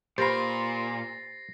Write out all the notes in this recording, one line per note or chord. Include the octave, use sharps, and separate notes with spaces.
A#2 G4 B4 C5 B5 A6 A#6 C7